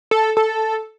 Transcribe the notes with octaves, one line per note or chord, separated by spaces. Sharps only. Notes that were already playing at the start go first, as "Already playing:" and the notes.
A4
A4